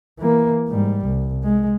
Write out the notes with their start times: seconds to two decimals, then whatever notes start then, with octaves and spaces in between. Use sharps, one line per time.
0.19 E3 A#3
0.69 G#2 G3
1.06 C2
1.44 G#3